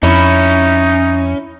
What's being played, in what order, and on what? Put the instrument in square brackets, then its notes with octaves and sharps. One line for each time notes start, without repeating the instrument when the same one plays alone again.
[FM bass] F2 [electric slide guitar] C#4 [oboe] D#4 [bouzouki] E4